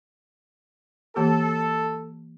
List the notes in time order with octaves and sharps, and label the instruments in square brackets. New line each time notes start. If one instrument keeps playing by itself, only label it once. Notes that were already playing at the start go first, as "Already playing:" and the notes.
[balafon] E3 A#3 G4 [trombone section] A4